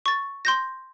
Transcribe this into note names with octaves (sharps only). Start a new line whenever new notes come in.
C#6 A6
C6 G6 A#6